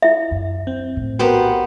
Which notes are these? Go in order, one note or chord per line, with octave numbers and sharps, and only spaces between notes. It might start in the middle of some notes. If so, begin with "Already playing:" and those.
E4 E5
F#2
C4
A#1 A2
B3 F#4 G4 A#4 C5